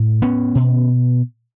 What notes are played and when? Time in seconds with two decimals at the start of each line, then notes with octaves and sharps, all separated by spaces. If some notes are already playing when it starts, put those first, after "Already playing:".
Already playing: A2
0.22 B3 C#4
0.55 B2